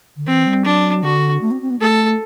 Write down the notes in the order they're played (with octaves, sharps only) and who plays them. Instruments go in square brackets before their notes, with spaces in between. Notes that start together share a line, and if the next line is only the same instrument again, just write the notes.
[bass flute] D3
[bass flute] E3 [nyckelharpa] C4
[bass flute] G3
[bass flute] F#3 [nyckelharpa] D4
[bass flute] D3 [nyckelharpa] F#4
[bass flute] A3
C4
C4
B3
[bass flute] A3 [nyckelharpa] A4